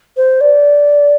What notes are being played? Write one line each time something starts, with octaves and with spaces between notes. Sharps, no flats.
C5
D5